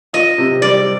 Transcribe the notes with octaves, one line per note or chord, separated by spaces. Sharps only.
F4 D#5
C3
G3 D5